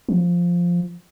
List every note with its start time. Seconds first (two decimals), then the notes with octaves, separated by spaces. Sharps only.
0.09 F3